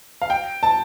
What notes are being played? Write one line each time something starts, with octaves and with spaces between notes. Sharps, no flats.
F5
G5
A5